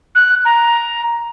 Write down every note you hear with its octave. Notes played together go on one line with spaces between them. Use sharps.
F#6
A#5